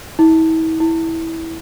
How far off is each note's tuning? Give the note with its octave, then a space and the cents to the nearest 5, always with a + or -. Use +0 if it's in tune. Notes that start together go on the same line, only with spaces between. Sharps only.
E4 -40
E4 -15